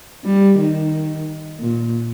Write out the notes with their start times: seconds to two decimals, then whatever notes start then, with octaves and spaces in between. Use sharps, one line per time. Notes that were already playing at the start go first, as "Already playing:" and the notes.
0.25 G3
0.58 D#3
1.59 A#2